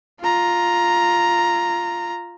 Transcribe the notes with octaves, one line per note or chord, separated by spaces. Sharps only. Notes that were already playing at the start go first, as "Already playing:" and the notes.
F4 A#5